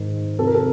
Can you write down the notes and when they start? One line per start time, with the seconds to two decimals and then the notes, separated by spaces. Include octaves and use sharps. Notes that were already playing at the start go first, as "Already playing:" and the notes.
Already playing: G#2 D#3
0.39 F2 C3 F3 A4
0.47 A#4
0.54 A4